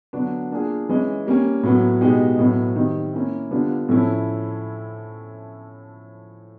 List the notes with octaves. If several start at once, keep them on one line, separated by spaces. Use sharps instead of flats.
D3 F#3 B3 D4 F#4
A#3 D4 F4 G#4
E3 G#3 C#4
G3 A#3 C#4
A2 F#3 B3
B2 G#3 B3 D#4 G4
A2 F#3 B3
D#3 G3 C4
A#3 C#4 E4
D3 G3 B3 D4 F4
A2 F3 A3 C#4 E4